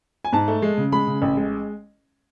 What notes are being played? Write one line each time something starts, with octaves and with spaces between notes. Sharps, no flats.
G#5
G#2 A5
A3
G#3
C#3
G#3 B5
C#3
A1
G#3